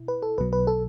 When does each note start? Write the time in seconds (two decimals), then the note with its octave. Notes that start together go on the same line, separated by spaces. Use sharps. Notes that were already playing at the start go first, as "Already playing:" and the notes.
Already playing: B2 E4
0.08 B4
0.22 A4
0.38 B1 B2 F#3 B4
0.53 B4
0.67 A4